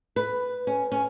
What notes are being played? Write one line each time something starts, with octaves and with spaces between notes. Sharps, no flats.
B4
C#4
C#4